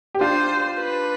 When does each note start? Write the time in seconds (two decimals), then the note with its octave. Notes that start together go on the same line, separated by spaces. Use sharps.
0.15 G4
0.21 D4 F4 C5
0.80 B4